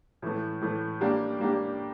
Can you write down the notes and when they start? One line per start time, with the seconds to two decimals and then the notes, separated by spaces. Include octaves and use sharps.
0.22 A2 E3 A3
0.61 A2 E3 A3
1.01 G3 A#3 D4 G4
1.40 G3 A#3 D4 G4